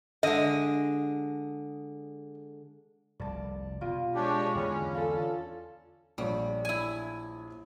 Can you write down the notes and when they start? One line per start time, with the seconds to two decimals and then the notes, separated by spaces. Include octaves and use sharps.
0.23 D3 G#3 D#5
3.20 F1 C2 D5 A5
3.81 B2 G3 F4
4.15 G#3 D4 G4 C#5
4.55 E2 D3 E3 C#4 F5 G#5 B5
4.94 D4 F4 A4
6.18 A#1 G3 C#5
6.65 E4 G#5